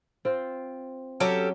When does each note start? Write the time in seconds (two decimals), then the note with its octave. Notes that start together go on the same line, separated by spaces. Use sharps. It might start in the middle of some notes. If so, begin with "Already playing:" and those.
0.25 C4 F4 C5
1.20 F#3 C#4 G4 A4